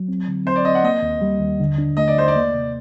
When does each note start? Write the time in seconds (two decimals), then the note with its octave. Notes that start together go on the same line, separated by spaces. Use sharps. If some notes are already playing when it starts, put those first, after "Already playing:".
Already playing: F#3
0.08 C4
0.27 D3
0.46 C4 C5
0.56 D5
0.65 C4 D#5
0.75 F#5
0.84 A#3 D#5
1.02 D#2
1.22 G3
1.40 D#2
1.60 D3
1.78 D4
1.97 A3 D#5
2.08 D5
2.16 D#2 C5
2.28 D5
2.36 A#3
2.54 C3